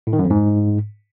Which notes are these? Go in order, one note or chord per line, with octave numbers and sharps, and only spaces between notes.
A2
D#3
F#2
F2
G#2